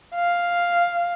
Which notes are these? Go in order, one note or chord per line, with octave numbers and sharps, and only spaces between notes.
F5